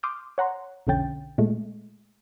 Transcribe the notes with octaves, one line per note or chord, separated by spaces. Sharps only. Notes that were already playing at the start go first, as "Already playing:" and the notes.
C6 D6 D#6 F6 G6
C#5 F#5 A#5 C6
B1 F2 D3 C#4 G5 A6
A#2 G#3 A3